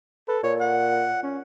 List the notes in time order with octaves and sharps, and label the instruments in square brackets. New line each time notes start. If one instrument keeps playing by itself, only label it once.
[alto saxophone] A4 [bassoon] B4
[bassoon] A#2 [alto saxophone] C#5
[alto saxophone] F#5
C#4